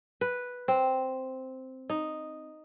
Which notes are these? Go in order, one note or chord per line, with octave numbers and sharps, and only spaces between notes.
B4
C4
D#4